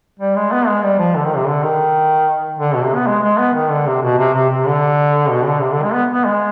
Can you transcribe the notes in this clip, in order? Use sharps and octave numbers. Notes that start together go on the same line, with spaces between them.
G3
G#3
B3
G#3
G3
F3
D3
D#3
C3
D3
D#3
D3
B2
C3
B3
G#3
G#3
B3
D#3
D3
C3
B2
C3
C3
C3
D3
B2
D3
C3
D3
G#3
B3
B3
G#3